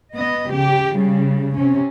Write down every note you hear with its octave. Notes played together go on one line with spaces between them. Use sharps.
B3 D#5
C#3 G4
C#3 G3
C3 C#4